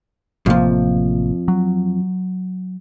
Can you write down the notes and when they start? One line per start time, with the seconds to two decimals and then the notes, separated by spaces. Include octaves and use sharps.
0.46 A1 F2 C3 F3 A#3
1.48 F#3